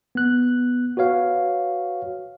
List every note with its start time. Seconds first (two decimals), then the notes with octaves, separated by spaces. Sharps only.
0.15 B3 F#6
0.97 F#4 B4 C#5 F5